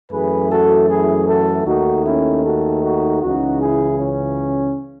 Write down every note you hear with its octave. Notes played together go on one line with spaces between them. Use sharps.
F#2 E3 A3 G#4 B4
F#4 A4
E4 G#4
F#4 A4
D#2 D#3 A3 D#4 F#4
C#4 E4
F#4 A4
D#4 F#4
C#2 C#3 E3 D#4 F#4
E4 G#4
C#4